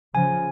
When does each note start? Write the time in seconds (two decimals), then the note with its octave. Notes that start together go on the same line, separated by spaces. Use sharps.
0.15 C#3 F3 G#5